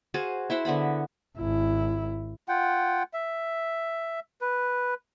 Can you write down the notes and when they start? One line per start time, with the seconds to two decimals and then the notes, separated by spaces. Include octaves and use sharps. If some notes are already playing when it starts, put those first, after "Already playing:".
0.14 F#4 G#4 C5 F5
0.50 E4 C5 E5 F#5
0.65 D3 B3 F#5 B5
1.38 G#1 E4
2.48 F4 F#5 G5
3.13 E5
4.41 B4